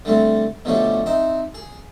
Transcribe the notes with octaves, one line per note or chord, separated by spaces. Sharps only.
D3 G3 A3 C4
B2 D3 F3 A3 C#4 G4
C4 D#4 E5
G#4